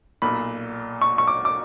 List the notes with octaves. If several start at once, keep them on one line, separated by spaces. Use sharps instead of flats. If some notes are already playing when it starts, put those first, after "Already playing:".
B1 A#2 B5
C#6
C#6
D6
D6